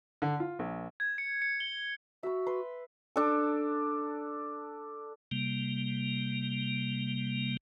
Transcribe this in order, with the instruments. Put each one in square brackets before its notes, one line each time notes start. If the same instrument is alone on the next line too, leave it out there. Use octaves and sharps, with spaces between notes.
[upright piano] D3
F4
A#1
[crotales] G#6
C#7
C#7
G7
[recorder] F#4 [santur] E5 B5
[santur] B4 C6
[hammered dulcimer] D4 A4
[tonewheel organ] C3 G3 A#3